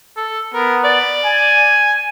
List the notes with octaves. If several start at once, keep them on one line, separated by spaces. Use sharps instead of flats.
A4
B3 A#4
D5
G#5